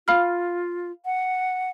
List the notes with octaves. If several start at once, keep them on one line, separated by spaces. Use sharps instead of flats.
F4 F5 B5 F6
F#5